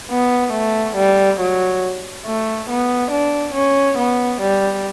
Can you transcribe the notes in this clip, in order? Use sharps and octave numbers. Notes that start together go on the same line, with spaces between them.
B3
A3
G3
F#3
A3
B3
D4
C#4
B3
G3